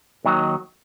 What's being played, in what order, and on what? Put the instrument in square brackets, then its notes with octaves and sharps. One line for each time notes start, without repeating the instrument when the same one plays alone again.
[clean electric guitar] D#2 D#3 F#3